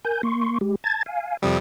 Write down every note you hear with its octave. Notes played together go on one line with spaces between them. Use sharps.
A#4 G#5 G6
A#3 C6 C#6
G#3 G4
A5 G#6 A6
F5 G#5
F2 C3 G3 D#6